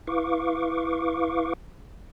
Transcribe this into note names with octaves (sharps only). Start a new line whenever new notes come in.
E4 B4 F5 C#6 D6